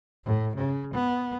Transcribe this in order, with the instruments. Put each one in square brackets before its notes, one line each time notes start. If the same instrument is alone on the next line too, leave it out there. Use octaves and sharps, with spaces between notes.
[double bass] A2
C#3
B3